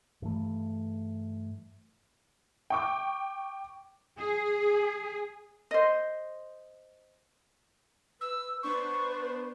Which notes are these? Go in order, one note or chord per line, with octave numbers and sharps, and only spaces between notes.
G2 E3 A3
G5 C#6 D6
G#4
C5 D#5
B4 E6
B3 D4 B4 C5 C#6